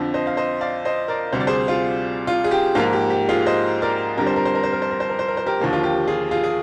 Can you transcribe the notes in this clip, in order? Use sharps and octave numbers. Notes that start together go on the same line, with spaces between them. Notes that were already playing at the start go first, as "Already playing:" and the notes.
Already playing: F2 D3 F3
C5 D#5
F5
C5 D#5
D5 F5
C5 D#5
A#4 D5
D2 C3 G3 C5
D5
G#4 C5
F4 G#4
F4
G#4
G4
G#2 F3 A#3 F4
G4
G4
F4 G#4
C5 D#5
A#4 D5
F2 D3 G3 A#4
C5
A#4
C5
A#4
C5
A#4
C5
A#4
C5
A#4
C5
A#4
C5
G4 A#4
D#2 D3 F3 A#3
F4
G4
F4 G#4
F4 G#4
G#4